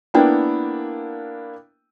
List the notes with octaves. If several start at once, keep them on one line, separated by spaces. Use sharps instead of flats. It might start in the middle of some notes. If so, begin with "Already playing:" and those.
A#3 B3 D4 E4 G5